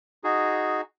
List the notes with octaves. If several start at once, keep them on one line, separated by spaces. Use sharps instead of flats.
D#4 F#4 G#4